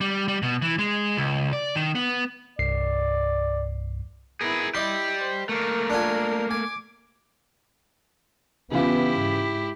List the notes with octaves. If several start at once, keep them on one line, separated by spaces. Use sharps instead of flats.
G3
G3
B2
E3
G#3
C#2
D5
D#3
B3
C2 G2 D5 C7
B3 E4 G#4 A#4
E4 G4 D5 D#5 C6
C5
A3 A#3 A#4
D4 F4 G#5
G#5 D6
C#3 E3 B3 E4 F4 G4
G#2